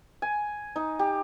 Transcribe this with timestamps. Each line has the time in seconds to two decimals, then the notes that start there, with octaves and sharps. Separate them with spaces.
0.22 G#5
0.76 D#4
0.99 G4